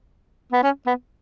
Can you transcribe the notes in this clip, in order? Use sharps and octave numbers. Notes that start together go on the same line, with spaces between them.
B3
C#4
B3